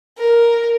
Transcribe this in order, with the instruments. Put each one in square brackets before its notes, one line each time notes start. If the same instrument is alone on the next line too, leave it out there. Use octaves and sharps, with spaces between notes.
[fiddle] A#4